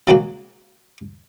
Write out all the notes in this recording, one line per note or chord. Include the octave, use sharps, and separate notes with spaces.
C#3 F#3 G#3 A#3 F#4